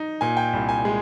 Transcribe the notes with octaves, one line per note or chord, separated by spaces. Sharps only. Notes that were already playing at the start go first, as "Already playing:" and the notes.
Already playing: D#4
A#2 G#5
G5
C2
G#5
G#3